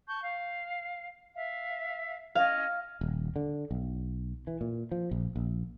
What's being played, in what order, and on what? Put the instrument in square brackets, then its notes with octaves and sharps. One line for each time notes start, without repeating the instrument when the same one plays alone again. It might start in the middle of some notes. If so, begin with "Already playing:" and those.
[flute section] A5 C#6 G6
F5
E5 F5
[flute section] C#4 D#5 [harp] F5
[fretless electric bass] D#1
D3
B1
E3
A#2
F3
A#1
A#1